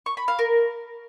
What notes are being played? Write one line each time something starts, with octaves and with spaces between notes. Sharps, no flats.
C#6
B5
F5
A#4